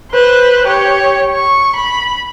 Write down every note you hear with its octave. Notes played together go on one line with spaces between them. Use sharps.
B4 C5
G4 C#5
C#6
B5